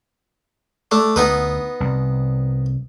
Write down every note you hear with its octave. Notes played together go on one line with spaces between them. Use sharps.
A3 D4
D2 B3 D#4 B4
C2